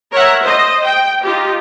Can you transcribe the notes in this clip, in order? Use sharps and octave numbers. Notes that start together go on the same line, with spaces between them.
A#4 C#5 E5 F#5
C5 D#5
G5
D#4 F4 G4